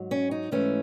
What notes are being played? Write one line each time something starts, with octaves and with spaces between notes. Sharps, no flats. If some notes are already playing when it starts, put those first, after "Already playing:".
Already playing: G#2 F#3
C#4
D#4
G#2 E3 A3 C#4